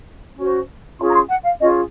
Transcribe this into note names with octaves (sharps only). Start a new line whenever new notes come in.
C#4 F#4 C5
C#4 F4 G#4 C6
A#5
C6
F#5
F5
C#4 F4 G#4 D#5